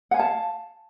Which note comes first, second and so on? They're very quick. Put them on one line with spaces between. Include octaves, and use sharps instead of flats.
F#5 G#5 F5 A5